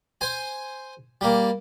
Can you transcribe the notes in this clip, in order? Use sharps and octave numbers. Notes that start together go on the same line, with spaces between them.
C5 G#5
G3 A#3